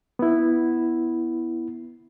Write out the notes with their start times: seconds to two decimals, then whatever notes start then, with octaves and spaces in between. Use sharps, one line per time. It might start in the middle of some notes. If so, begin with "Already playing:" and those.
0.19 B3 E4